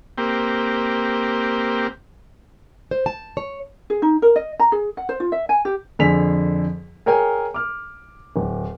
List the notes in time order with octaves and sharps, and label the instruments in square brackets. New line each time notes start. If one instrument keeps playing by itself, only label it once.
[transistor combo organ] A#3 C4 G4
[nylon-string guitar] C5
A5
C#5
[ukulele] G#4
D#4
A#4
D#5
A#5
G#4
F#5
C5
F4
E5
G#5
G4
[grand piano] F2 D3 G#4 G#5 B6 F7
G#4 A#4 C#5 G5 G#5
D6 F6
D1